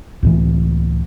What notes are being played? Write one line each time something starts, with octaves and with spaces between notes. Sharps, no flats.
C#2 A2 E3